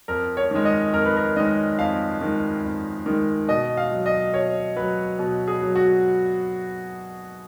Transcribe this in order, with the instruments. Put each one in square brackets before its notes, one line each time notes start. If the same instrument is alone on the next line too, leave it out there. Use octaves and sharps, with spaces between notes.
[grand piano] F2 A#4
C#5
D#3 G#3
D#5
F2 A#4
B4
A#4
D#3 G#3 D#5
F2 F5
D#3 G#3
F2
D#3 G#3
B2 D#5
F5
F#3
D#5
B2 C#5
F#3 B4
B2
G#4
F#3
F#4